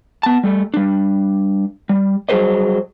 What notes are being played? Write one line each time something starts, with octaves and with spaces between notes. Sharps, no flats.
B3 A5
G3 A3
G3 D4
G3
F#3 G3 G#4 B4 C5 D#5